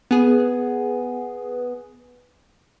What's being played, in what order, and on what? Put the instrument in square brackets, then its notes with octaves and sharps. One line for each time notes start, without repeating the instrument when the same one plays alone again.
[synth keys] B3 G#4